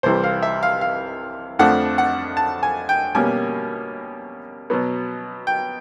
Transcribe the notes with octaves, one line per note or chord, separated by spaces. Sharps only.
C2 C3 E3 G3 C5
F5
E5
F5
F5
F2 D3 F3 A3 D4 F#5
F#5
A5
G#5
G5
B2 G3 A#3 C#4 G#5
B2 F#3 B3
G5